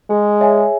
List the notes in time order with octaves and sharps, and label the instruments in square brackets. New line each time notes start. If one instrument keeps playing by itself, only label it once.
[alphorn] G#3 [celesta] G#4
[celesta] C#5 E5 G#5